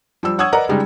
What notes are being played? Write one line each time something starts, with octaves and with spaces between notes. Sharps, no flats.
F3 G3 E6
C#5 F#5 C#6 D#6 E6 G#6
A#4 B4 D5 D#5 F#5 A#5
C#3 G3 G#3 D#4 G4